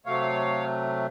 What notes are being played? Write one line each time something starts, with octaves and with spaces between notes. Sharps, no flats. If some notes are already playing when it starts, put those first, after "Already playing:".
C3 F#3 A3 C#5 F5